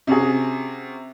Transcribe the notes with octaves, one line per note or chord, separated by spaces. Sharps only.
C3 C#4 F#4 G#4